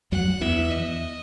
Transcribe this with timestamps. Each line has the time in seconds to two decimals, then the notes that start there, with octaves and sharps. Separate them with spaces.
0.12 F#2 F#3 F#5
0.41 E2 E3 E5
0.70 D#5